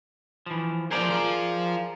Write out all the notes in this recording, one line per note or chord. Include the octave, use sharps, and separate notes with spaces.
E3 F3
F3 G#4 A#4 C5 D5
F4 C5